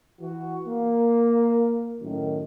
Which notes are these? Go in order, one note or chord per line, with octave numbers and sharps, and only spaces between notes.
E3 F#4
A#3
F#2 A2 D#3